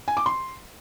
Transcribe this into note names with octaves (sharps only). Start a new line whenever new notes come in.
G#5
D6
C6